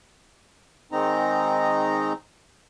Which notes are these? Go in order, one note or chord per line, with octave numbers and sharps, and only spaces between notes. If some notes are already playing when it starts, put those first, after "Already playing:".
D#3 G#3 C4 D#4 A#5